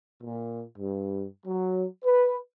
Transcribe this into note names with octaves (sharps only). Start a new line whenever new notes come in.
A#2
G2
F#3
B4